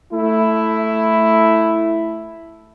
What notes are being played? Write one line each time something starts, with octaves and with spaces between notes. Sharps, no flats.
A3 E4